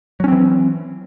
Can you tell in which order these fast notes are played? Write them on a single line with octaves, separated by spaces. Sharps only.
F#3 C#4 C4 E3